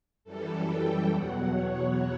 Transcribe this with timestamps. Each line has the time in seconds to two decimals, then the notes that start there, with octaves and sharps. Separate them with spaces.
0.24 F#2 E3 G3 A4
0.66 G5
1.08 E2 B2 F#3 F#5
1.49 C#5